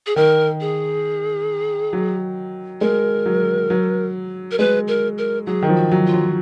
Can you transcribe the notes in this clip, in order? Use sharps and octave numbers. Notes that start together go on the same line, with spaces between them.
G#4
D#3 A#4
G#4
F#3
G#3 A#4
F#3
F#3
A#4
G#3 B4
A#4
A#4
F#3 G#4
D#3
F3
F#4
F#3
F4
F#3